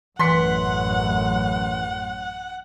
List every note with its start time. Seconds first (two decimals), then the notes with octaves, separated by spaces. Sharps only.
0.19 A1 F#2 E3 F#5 C6 B6 C#7